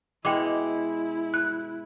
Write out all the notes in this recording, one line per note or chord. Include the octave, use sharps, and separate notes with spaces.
B2 G#3 E4 G5 D6
F#6